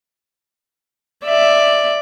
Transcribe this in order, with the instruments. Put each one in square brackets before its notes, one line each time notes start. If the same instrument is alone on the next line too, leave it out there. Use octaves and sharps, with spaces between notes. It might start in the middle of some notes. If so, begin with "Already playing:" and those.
[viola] D5 E5